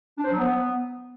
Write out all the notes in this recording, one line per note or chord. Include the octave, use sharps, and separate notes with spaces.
D4
C5
F#3
B3